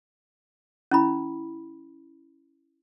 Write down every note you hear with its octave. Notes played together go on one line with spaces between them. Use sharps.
C#4 E4 B5